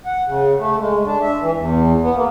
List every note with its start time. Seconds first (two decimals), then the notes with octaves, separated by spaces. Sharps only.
0.06 F#5
0.27 C#3
0.58 A3
0.79 G#3
1.06 D4
1.22 E5
1.41 E3
1.57 E2
2.01 B3
2.15 A#3